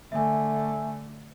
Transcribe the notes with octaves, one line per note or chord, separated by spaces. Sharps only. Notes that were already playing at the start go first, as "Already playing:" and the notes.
D3 A3 E5 G#5